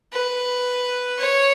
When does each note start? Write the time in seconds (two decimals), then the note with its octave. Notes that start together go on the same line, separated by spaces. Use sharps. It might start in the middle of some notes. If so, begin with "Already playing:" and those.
0.13 B4
1.18 C#5